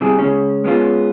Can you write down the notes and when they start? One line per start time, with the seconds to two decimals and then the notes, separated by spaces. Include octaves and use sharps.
0.01 C3 G3 E4 G#4
0.19 C#3 G#3 C#4
0.64 G#3 B3 C#4 F4